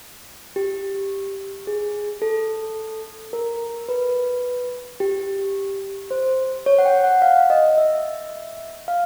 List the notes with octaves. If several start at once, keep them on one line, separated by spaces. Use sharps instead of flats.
G4
G#4
A4
A#4
B4
G4
C5
C#5
F#5
G5
F#5
F5
D#5
E5
F5